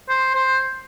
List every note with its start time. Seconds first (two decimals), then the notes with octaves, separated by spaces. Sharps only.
0.10 C5
0.35 C5